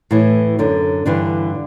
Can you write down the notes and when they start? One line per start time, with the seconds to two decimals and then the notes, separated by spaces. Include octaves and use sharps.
0.11 A2 E3
0.59 F#2 D3
1.06 G2 D3 E3 D4